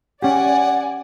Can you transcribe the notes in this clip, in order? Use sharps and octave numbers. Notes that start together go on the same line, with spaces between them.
C#4 G4 D5 F#5 G#5